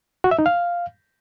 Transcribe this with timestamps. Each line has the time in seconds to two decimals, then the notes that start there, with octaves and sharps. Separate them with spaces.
0.24 F#4
0.31 E5
0.39 D#4
0.46 F5